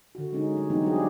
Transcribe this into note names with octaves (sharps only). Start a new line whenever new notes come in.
D3 F#4
G#3 C#4 D#4
G3
E3 F#3 A3 B3 C4 D#4
G3 D4 F4 F#4 G#4
D4 D5